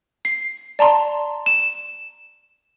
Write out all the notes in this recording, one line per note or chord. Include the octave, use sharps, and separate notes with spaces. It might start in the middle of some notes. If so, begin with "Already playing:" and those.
C7
D5 A5 A#5 C6
E7